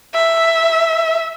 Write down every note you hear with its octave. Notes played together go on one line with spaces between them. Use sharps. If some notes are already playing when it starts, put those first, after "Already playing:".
E5